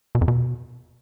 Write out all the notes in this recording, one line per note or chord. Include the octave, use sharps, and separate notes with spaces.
B2
F2
B2